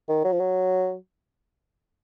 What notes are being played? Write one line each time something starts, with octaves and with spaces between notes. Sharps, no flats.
D#3
F#3
F3
F#3